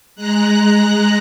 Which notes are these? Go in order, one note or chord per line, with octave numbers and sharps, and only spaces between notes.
G#3 A#5 F#6